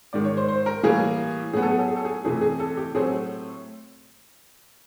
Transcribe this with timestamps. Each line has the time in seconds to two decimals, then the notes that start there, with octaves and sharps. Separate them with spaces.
0.13 G#2 D#3 G#3 D5
0.25 C#5
0.37 C5
0.48 C5
0.66 A#4
0.83 A2 E3 G3 A#3 G#4
1.53 A2 F#3 B3 G#4
1.62 A4
1.71 G#4
1.79 A4
1.88 G#4
1.96 A4
2.05 G#4
2.25 F2 C3 E3 A3 G#4
2.41 G#4
2.60 A4
2.77 G4
2.95 A2 F#3 A3 C4 G#4